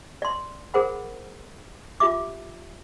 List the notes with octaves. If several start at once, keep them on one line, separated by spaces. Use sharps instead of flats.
D5 C6
G#4 A#4 C5 F#5 B5
F4 G4 E5 D6